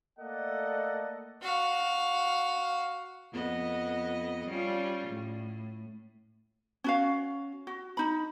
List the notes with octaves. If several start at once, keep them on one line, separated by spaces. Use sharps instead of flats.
A3 A#3 A4 D5 D#5 F#5
F#4 F5
F2 B3 D#5
G3 C#4 F4
A2
C#4 F#4 F5
F#4
D#4 B5